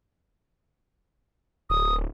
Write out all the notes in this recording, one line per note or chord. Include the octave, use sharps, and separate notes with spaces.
D1 D#6